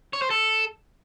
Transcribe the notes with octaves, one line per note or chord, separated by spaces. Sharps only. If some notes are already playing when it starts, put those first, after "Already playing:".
C#5
C5
A4